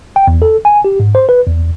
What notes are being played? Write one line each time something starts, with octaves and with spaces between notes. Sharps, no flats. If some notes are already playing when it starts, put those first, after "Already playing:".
G5
E2
A4
G#5
G4
G#2
C5
B4
E2